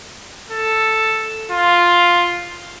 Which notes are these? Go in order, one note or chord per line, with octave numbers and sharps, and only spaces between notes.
A4
F4